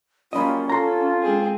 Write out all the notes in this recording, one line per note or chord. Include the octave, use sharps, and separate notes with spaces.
F#3 G3 A#3 C#4 F4 D#5 B5
F4 A4 A#5 C6
G#3 C4 G#4